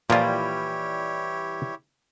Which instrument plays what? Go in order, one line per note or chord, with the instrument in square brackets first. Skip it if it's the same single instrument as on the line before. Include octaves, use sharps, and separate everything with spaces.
[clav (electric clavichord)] A#2 F3 F4 [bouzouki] E3 G3 [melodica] E4 G4 C#5